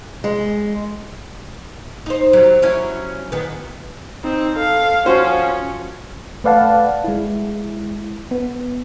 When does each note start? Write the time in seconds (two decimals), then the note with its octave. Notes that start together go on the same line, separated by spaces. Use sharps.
0.24 G#3
2.06 D#4 C5
2.33 F#3 G3
2.62 F#3 C#4 E4
3.32 D#3 B3
4.24 C4 D#4
4.56 A4 F5
5.06 F3 C#4 F#4 C5
6.44 A3 B4 D5 F5 F#5 A5
7.04 G#3 E4
8.31 B3